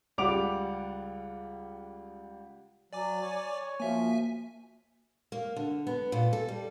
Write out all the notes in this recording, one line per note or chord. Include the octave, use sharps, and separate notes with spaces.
C#2 G3 F#5 D6 D7 F7
F#3 D5 G#5 D6
C#5
F3 A#3 F#4 E5 G#5
A#3
D3
B3
A#2
A4
G3